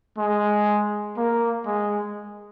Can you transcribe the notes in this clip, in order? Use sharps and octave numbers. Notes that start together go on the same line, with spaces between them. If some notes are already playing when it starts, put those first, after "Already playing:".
G#3
A#3
G#3